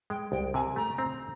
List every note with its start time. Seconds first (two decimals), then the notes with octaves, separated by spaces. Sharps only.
0.10 G#3 G5
0.32 C2 G5
0.54 C3 G#5
0.76 A3 A#5
0.98 C4